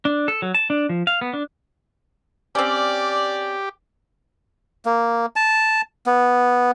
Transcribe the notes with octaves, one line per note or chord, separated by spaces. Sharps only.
D4
A4
F#3
A5
D4
F3
F5
B3
D4
C4 C#4 G4 D5
A#3
A5
B3